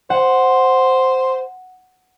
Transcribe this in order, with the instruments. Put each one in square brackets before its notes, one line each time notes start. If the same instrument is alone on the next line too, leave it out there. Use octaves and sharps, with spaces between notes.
[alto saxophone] C5 [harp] F#5